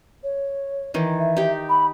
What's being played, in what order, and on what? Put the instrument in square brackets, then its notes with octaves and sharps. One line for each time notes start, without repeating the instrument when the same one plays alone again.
[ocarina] C#5
[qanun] D#3 E3
[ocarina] E5
[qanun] D#4 G4
[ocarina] B5